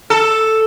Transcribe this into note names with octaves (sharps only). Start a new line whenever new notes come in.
A4